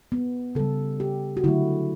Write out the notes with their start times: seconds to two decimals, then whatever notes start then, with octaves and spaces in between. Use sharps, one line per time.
0.12 B3
0.55 C#3 G3 A4
1.00 G4
1.37 F#4
1.44 D3 F#3 A3 E4